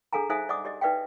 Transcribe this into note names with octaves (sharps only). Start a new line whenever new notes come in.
D4 G#4 A4 F5 G#5 A#5
D#4 C5 E5 F5 G#5 D#6
D5 D#5 F#5 D6 D#6
G4 D5 D#5
D#4 B4 D5 E5 F5 G5